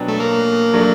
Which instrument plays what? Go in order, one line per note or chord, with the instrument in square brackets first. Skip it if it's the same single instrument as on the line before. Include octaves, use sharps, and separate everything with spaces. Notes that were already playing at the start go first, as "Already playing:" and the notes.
Already playing: [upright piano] B2 F#3 B3 D4 G4
[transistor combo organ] A3
A#3
[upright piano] F#3 A3 D4